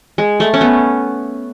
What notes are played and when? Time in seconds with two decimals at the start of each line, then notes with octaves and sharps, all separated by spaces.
0.18 G#3
0.40 A3
0.54 C#4
0.61 B3